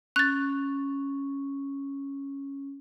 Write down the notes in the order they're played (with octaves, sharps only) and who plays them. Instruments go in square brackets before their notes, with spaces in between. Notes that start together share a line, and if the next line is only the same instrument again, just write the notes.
[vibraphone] C#4 [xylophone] F#6 A6